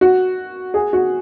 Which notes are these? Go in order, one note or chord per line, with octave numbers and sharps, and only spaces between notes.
F#4
G#4
F#4